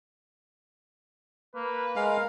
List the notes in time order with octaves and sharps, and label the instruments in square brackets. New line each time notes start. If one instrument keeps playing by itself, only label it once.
[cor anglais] A#3 [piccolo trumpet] B4
[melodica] G#3 F5 [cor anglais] A#4